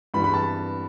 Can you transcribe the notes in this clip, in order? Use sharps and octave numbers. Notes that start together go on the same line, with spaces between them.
G2 E3 B3 B5
B5
A5